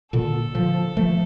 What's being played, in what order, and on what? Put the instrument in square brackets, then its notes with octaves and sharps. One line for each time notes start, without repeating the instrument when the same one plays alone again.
[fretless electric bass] A#2 D3 [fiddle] A4
[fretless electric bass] D3 F3
F3 A3